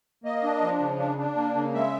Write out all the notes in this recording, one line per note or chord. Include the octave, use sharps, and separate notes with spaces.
A#3 D#5
D4
F3
C#3
D4
D4
A#3
C#3
G#3 E5